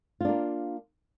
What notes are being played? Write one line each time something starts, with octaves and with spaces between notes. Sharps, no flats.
A#3 D4 F4